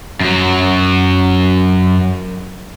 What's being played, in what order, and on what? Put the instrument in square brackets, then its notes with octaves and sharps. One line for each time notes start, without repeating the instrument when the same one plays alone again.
[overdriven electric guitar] F#2 F#3